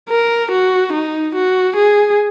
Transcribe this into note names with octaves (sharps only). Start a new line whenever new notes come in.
A#4
F#4
D#4
F#4
G#4